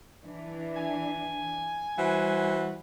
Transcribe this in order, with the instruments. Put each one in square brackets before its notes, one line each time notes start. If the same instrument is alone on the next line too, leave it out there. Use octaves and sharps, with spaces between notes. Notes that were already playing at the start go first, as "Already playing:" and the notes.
[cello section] E3 D4
[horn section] G#5
[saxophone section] E3 F#4 C5 [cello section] G3